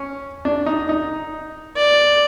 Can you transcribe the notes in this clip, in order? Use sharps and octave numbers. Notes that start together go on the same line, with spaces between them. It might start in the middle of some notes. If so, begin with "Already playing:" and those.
Already playing: C#4
D4
D#4
D#4
D5